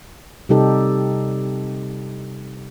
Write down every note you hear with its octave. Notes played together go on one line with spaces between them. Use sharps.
C3 G3 D#4 G4 A4 D#5